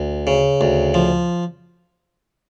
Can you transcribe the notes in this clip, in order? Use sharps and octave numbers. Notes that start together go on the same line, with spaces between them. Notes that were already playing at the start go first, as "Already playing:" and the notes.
Already playing: D2
C#3
D2
F3